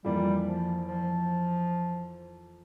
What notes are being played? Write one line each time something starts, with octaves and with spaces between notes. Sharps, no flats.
F2 E3 G3 A#3 F4
F3
F3